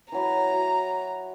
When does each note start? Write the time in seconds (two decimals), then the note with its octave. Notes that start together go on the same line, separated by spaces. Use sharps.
0.12 E3 F#3 A#5 B5
0.52 F#4